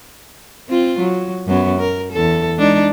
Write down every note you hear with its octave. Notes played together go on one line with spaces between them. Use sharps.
C4 F4
F#3
F#2 F#3 B3
A#4
E2 A4
G#3 D4 D#4